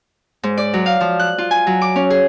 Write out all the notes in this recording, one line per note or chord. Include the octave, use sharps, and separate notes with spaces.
G#2
D5
F#3
F5
F3
F#6
F4
G#5
F#3
D6
C#4
G#4